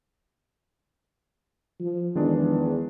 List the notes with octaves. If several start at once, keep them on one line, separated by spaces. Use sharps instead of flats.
F3
E2 D#3 G#3 D4